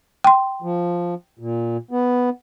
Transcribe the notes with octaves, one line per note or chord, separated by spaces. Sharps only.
G5 C6
F3
A#2
B3